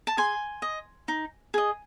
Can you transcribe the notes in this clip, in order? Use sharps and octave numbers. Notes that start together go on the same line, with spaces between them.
A5
G#4 G#5 C6
D#5
D#4
G#4 D#5